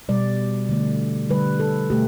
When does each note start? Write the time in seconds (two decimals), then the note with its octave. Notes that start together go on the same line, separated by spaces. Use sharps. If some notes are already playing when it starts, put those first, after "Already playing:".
0.08 B2 G3 D5
0.69 D3 A3
1.29 D3 G3 B4
1.60 A4
1.90 B2 A3 G4